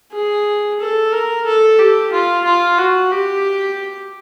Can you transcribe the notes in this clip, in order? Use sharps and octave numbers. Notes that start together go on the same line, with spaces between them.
G#4
A4
A#4
A4
G4
F4
F4
F#4
G4